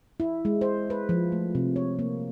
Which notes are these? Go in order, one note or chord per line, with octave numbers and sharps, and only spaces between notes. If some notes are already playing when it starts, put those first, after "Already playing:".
E4
G#3
C5
B4
F3
A3
C3
C#5
A#3